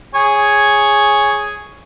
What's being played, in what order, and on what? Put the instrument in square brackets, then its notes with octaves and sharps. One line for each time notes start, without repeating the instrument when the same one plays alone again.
[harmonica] G#4 C#5 G#5